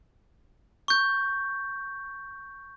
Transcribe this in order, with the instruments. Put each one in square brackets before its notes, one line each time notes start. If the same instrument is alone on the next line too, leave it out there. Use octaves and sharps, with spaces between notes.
[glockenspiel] C#6 G6